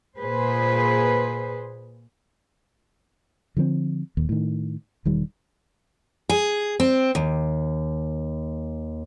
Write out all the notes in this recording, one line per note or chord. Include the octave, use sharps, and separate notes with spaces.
A#2 G#4 B4 C5
D3 F3 G3 C4
D#1 D#2
A2 D#3
E1 D#3 G3
G#4
C4
D#2